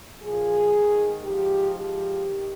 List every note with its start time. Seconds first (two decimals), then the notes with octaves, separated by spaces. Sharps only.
0.23 A#2 F3 G#4
0.74 G#2 D#3
1.24 G#2 F3 G4
1.75 G#2 F3 G4
2.25 D#3